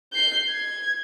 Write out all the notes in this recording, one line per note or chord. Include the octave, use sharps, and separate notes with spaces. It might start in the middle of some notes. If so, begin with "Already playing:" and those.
G6 C7
G#6